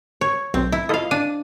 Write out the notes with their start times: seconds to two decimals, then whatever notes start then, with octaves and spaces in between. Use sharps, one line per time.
0.21 C#5
0.54 B1 C4
0.72 E4
0.89 E4 F4 A4 D#5 F5
1.11 D4 D#7